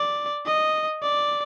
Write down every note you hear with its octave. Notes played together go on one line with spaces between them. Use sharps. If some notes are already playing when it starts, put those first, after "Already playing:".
Already playing: D5
D#5
D5